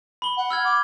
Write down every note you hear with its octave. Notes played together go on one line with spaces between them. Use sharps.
B5 G7
F#5
E6 F6 G#6
D6